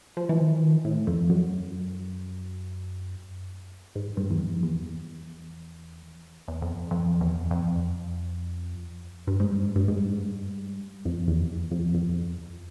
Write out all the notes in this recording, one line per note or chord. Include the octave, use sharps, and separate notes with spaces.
F3
E3
D#3
E3
D#3
A2
F2
F#2
G#2
G2
E2
F2
E2
E2
F2
F2
E2
F2
E2
F2
G2
G#2
G2
G#2
G2
G#2
G2
G#2
G2
F2
E2
F2
E2
F2
F2